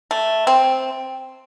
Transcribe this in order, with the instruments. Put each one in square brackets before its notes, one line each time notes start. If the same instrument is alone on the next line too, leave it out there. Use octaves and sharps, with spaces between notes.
[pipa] A3
C4